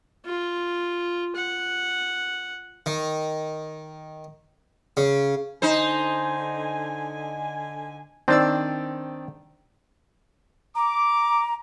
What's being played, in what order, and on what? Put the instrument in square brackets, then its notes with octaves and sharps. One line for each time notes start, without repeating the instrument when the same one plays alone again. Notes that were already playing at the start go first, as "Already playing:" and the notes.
[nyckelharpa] F4
F#5
[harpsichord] D#3
C#3
[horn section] D3 G#5 [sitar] D#4 C5
[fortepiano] D#3 D5 E6 [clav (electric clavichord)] C4 D4 C5
[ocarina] A#5 [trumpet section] D6